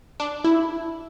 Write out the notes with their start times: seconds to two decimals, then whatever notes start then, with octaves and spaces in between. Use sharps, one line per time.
0.20 D4
0.44 E4